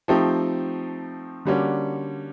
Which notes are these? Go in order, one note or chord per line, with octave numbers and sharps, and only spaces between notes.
F3 A3 C4 D#4 G4
D3 G3 A#3 C#4 F#4